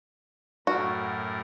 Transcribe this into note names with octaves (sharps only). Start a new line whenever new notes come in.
F#2 A2 F#4 A#4